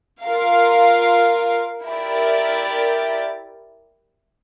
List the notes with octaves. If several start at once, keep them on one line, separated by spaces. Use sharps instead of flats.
F4 A#4 F5
E4 G4 A#4 D5